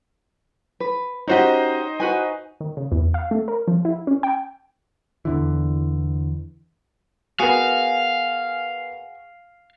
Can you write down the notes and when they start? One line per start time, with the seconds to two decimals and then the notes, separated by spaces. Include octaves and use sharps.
0.80 B4
1.28 C#4 D#4 F#4 G4 C5 D#5
2.00 F#4 B4 G#5
2.60 D#3
2.77 C#3
2.92 E2
3.14 F5
3.31 A3
3.48 A#4
3.68 F3
3.85 E4
4.07 C#4
4.23 G5
5.25 E2 D3 E3
7.39 B3 F#4 G#4 A#4 F5 G#5